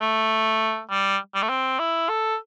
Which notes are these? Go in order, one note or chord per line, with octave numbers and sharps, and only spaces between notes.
A3
G3
G3
A3
C4
E4
A4